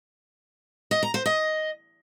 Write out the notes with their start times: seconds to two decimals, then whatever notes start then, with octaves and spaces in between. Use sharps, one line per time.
0.91 D#5
1.03 A#5
1.14 C5
1.26 D#5